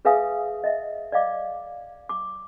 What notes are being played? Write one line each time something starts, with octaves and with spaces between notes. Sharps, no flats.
G#4 B4 E5 F5 G#5 D#6
D#5 E5
D5 D#5 F5 D6
D6